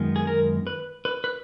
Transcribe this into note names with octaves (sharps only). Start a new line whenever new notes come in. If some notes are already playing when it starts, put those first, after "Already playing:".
Already playing: F#2 D#3 G#3 B3
G#4
A#4
B4
B4
B4